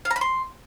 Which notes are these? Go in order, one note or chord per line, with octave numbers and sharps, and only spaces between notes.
F5
A#5
B5
C6